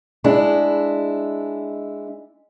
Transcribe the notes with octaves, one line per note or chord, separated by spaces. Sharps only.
G#3 D4 E4